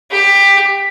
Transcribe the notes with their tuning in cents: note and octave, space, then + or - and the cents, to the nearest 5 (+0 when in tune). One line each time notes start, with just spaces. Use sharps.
G4 +15